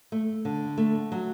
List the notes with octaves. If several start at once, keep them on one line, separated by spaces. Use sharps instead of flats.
A3
D3
A3
F#3